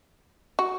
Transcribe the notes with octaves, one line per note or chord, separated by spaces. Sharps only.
F#4